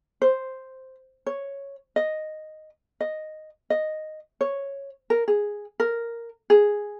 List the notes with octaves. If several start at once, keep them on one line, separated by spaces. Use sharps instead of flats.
C5
C#5
D#5
D#5
D#5
C#5
A#4
G#4
A#4
G#4